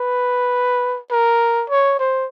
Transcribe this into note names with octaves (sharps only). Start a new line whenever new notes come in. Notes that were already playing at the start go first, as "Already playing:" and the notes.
Already playing: B4
A#4
C#5
C5